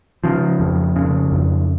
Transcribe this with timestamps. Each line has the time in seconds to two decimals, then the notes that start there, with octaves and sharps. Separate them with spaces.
0.24 C#3 F3
0.60 F2
0.96 C#3
1.32 F2